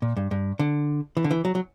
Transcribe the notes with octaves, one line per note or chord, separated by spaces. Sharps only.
A#2
G2
G2
D3
E3
D3
E3
F#3
F#3